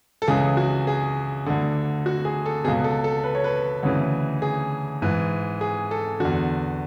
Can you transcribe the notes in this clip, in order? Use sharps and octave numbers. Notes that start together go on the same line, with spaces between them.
A4
C#2 C#3 E3 G#4
F#4
G#4
D2 D3
F#4
G#4
A4
C#2 B2 G#4
A4
A4
B4
C#5
B4
D2 C#3 E3
G#4
G#2 E3
G#4
A4
E2 D3 F#4